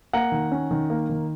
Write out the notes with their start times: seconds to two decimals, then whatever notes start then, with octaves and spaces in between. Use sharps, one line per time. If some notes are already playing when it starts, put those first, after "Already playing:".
0.13 A#3 F#5 A#5
0.32 D#3
0.52 C#4
0.71 D#3
0.90 A#3
1.09 D#3